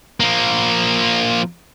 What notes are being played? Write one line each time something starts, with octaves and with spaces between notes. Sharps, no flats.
F3 A#3